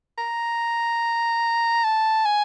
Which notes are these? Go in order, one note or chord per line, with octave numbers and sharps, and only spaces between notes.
A#5
A5
G#5